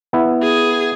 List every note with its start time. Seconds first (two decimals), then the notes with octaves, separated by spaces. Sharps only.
0.13 B3 E4
0.43 G#4